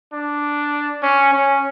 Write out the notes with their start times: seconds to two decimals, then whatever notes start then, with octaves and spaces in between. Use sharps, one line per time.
0.13 D4
1.03 C#4
1.33 C#4